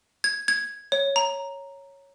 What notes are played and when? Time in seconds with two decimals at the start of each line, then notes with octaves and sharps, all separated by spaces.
0.24 G#6
0.48 G#6
0.92 C#5
1.16 A#5